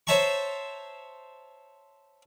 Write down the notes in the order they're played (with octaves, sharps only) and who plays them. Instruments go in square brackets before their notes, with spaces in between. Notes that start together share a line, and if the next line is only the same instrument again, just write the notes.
[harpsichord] C5 C#5 E5 A5 A#5 C#6